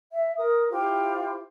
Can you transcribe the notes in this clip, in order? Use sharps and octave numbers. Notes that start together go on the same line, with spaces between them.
E5
A#4 D#6
E4 F4 G4 C5